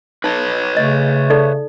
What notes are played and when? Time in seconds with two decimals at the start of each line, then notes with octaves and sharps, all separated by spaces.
0.24 D#4 B4 C#5
0.77 C#3 A3 D#5
1.30 D#4 A4 D5